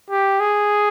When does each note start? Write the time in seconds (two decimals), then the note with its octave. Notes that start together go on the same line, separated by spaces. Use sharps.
0.10 G4
0.40 G#4